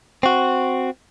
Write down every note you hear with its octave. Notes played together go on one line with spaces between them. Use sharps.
C4 F#4